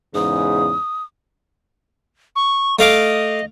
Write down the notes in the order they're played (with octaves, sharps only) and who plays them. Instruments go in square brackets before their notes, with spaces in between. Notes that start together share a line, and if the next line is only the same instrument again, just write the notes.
[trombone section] E2 G#2 C#3 [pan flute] D#6
[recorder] C#6
[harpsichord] A3 F5 D6 [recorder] D#5